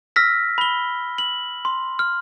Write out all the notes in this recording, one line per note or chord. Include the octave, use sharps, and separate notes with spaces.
E6 F6 A#6 B6
B5 G7
F#7
C6
F6